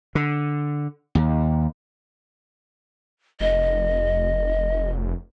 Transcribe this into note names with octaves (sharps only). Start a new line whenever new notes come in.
D3
D#2
F1 D#5